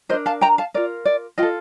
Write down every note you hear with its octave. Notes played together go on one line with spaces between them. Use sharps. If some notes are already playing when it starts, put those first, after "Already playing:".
D4 F4 A#4 C5 D#5
F5 A5
G5 A#5
F5 A5
F4 A#4 D5
D5
F4 A4 D#5 G5